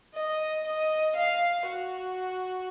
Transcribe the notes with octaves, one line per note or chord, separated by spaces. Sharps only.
D#5
D#5
F5
F#4